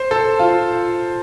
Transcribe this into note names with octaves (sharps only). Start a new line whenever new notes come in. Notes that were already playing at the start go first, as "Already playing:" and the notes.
Already playing: C5
A4
F4